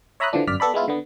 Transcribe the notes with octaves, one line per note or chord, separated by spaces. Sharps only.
C#5 E5 A#5 B5 D#6 F#6
D3 E3 F3 D4
G1 F#2 D5 F6 B6
B3 A4 D5 B5
G#3 B3 E4 F4
D3 B3